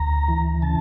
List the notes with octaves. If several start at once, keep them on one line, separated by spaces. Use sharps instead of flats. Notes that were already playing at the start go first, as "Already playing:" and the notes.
Already playing: D2 A#5
E3
C#3 A5